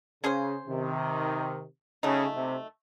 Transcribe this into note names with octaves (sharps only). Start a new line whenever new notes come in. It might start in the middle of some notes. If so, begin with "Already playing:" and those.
C#3 C#4 G#4 C5
C3 D#3
C#3 F#3 A3 D#4
C3